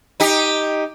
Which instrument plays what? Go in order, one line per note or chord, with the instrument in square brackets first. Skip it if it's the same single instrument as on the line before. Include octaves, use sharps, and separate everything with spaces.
[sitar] D#4 G4